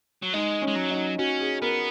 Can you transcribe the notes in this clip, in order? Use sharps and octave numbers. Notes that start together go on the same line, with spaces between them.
F#3
G#3 D#4
C#4
G#3
F#3
D#4
C#4 F#4
G#4
B3 A#4